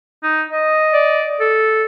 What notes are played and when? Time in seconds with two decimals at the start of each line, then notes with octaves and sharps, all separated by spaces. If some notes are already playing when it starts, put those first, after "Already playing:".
0.23 D#4
0.52 D#5
0.93 D5
1.40 A4